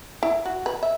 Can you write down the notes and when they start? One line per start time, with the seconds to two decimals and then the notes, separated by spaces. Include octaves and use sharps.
0.23 E4
0.45 F#4
0.66 B4
0.83 E5